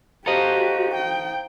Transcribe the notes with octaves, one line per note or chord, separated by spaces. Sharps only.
F#4 G4 A4 C5 D#5 F5 A#5
G5